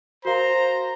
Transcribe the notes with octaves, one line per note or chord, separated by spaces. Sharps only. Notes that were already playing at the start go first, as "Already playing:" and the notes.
F#4 A#4 C5 F5 A#5